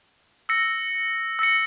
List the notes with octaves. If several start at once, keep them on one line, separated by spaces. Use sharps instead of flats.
E6 A#6 C#7
E6 A#6 C#7